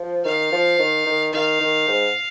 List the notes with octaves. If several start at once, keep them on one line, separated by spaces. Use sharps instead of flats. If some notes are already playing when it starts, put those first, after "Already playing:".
Already playing: F3
D#3 F5
F3
D#3
D#3
D#3 F5
D#3
G#2